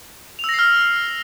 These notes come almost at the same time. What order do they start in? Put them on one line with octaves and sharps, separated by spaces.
F7 E6 A#6 C7 F6